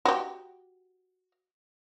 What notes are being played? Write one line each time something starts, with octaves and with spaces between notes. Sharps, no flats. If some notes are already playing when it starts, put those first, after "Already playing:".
F#4 G4